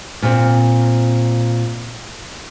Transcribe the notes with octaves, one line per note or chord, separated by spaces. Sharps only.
A#2 C4